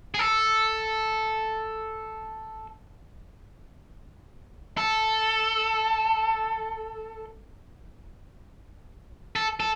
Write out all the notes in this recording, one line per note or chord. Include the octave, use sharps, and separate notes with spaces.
G#4
A4
A4
A4
A4